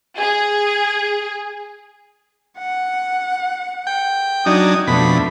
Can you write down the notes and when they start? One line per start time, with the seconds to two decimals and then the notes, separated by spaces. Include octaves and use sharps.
0.18 G#4
2.59 F#5
3.87 G5
4.46 F#3 D4 D#4 G#5 D#6
4.88 F2 B2 A3 D4 B5